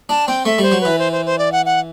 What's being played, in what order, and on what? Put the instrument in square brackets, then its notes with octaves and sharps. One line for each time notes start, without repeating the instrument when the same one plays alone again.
[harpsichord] D4 [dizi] A5
[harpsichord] C4 [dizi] G5
[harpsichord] A3 [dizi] E5
[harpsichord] G3 [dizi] C5
[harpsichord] F#3
[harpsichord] E3 [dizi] B4
[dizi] C5
C5
C5
D5
F#5
F#5